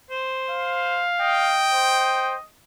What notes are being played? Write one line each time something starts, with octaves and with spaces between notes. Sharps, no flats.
C5
F5
D#5 G5
C5